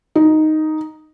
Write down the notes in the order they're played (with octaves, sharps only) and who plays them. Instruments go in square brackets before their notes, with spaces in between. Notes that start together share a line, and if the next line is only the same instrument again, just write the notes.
[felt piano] D#4